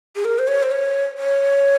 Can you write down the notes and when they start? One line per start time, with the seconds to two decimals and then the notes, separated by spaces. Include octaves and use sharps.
0.16 G#4
0.25 A#4
0.39 C5
0.48 C#5
0.63 C5
0.71 C#5
1.18 C#5